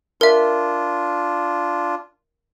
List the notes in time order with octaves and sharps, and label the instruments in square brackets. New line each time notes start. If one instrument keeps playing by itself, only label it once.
[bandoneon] D4 F4 [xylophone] A#4 E5